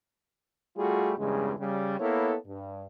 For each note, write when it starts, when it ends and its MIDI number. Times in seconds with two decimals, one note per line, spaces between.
0.78 1.13 55
0.78 1.13 57
0.78 1.13 65
0.78 1.13 66
0.78 1.13 68
1.18 1.53 40
1.18 1.53 43
1.18 1.53 49
1.18 1.53 56
1.59 1.99 49
1.59 1.99 55
1.99 2.37 58
1.99 2.37 59
1.99 2.37 64
1.99 2.37 69
1.99 2.37 73
2.47 2.87 43